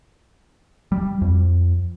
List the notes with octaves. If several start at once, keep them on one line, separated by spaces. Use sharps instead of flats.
G3
F2